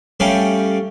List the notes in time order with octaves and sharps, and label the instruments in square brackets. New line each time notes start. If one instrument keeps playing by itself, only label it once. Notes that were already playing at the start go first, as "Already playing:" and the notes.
[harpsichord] G3 A3 C#4 F5 G5